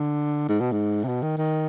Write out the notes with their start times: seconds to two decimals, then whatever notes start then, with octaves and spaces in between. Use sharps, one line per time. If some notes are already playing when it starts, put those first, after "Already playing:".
Already playing: D3
0.49 G#2
0.60 B2
0.72 G#2
1.04 C3
1.08 B2
1.22 D#3
1.37 D#3